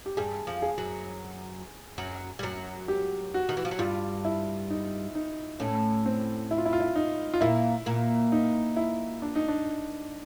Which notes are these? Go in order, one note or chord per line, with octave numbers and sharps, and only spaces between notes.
G4
G2 G3 G#4
F2 F3
G#4
F#2 F#3
F#2 F#3
G3
F#2 F#3
G4
F#4
D#3
E3
F3
F#3
G2 G3 F4
E4
D#4
D#4
A2 A3 C#4
C4
E4
F4
E4
F4
E4
D#4
F4
A#2 A#3 E4
A#2 A#3
D#4
E4
D4
D#4
D4